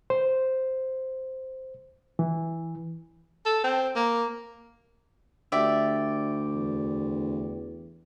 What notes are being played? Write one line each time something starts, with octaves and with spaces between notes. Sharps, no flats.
C5
E3
A4
C4
A#3
D2 G4 D5 E5
E2